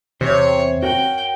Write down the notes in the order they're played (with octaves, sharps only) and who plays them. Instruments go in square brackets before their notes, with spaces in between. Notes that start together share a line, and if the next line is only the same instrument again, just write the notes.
[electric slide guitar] E2 C5 [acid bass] C3 [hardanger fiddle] C#5
[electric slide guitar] F#4 A#4 F#5 [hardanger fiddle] G5